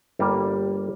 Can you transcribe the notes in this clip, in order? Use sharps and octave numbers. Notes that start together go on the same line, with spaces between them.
G1 G3 A#3